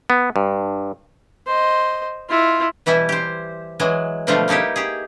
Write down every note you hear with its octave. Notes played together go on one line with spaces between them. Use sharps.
B3
G2
C5 D#5
E4 F4
B2 E3 G3 E4
G4 C5
E3 F#3 G#3
B2 D3 F3 G3 A3 F4
G3 A#3 D#4 E4 G4
G4 G#4